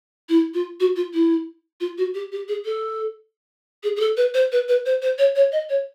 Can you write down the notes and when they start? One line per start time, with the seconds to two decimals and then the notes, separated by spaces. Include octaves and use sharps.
0.29 E4
0.54 F4
0.80 F#4
0.96 F4
1.14 E4
1.80 F4
1.98 F#4
2.14 G4
2.32 G4
2.48 G#4
2.65 A4
3.83 G#4
3.96 G#4
4.00 A4
4.17 B4
4.34 C5
4.52 B4
4.68 B4
4.86 C5
5.02 C5
5.18 C#5
5.36 C#5
5.52 D#5
5.69 C#5